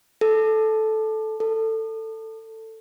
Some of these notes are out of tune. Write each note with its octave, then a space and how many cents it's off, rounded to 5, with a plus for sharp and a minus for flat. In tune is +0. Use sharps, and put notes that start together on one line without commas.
A4 -10
A4 +15